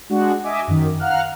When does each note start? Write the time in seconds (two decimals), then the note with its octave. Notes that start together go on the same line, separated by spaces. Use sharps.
0.10 G#3 D4 F#4
0.44 D#5 E5 G#5 D6
0.67 F#2 D#3
0.99 F5 F#5 A#5 F6 F#6